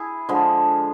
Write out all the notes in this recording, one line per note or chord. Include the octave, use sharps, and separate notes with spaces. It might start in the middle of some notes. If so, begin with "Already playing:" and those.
Already playing: E4 G#4
D3 F3 G#3